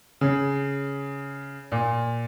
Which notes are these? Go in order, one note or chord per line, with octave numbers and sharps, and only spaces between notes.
C#3
A#2